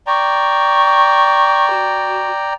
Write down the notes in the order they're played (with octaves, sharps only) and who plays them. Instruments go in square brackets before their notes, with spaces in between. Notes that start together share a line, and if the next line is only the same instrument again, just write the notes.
[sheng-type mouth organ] D5 G5 A#5 [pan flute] C#6
[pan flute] F#4